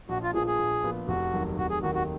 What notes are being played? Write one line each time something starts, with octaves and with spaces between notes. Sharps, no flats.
A#1 F#4
F4
A#2 F3 B3 F4 G#4
G#4
A#1
A#2 F3 B3 F4
F1 F#4
D#2 D#3 F#3
F1 F#4
G#4
D#2 D#3 F#3 F#4
F#4